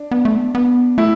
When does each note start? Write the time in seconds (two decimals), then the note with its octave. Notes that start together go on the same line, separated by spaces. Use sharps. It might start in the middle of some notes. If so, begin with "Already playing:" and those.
Already playing: D4
0.11 B3
0.25 A3
0.37 B3
0.55 B3
0.98 A3 E4